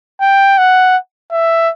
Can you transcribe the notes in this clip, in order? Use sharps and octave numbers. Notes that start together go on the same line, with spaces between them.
G5
F#5
E5